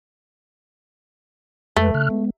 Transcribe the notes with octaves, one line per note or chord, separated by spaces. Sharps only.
F2 G#3 A3 B4
C#3 F6 F#6
G#3 B3